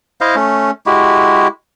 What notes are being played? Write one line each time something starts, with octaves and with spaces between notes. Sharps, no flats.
E4 C5 D#5 F5
A3 C#4
G#3 E4 F#4 G4